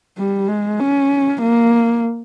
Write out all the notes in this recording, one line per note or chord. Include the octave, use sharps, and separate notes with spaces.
G3
G#3
C#4
A#3